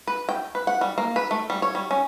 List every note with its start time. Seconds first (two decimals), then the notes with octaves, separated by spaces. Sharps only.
0.07 B4
0.29 G5
0.55 B4
0.67 F#5
0.81 G3
0.98 A#3
1.16 B4
1.31 A3
1.50 G3
1.62 C#5
1.75 G3
1.91 C#4